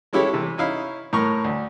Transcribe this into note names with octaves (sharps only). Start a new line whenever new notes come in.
G#3 C#4 E4 G4 A4 C#5
C3 E3
C#4 D#4 E4 F5
A2 A#4 C#6
D2